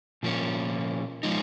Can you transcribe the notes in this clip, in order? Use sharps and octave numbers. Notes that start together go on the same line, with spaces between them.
A#2 F3 A#3 C#4
F3 G#3 D#4